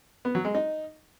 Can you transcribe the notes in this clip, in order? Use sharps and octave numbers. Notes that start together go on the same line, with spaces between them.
B3
F#3
G#3
D#4